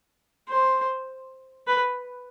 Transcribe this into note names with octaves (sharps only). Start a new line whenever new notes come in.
C5
B4